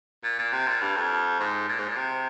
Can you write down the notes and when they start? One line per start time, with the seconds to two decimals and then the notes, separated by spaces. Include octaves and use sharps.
0.24 A#2
0.39 A#2
0.53 C3
0.67 A#2
0.82 G2
0.96 F2
1.40 G#2
1.69 A#2
1.79 G#2
1.88 A#2
1.97 C3